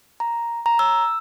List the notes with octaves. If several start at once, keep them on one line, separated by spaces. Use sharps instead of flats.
A#5
A#5
E6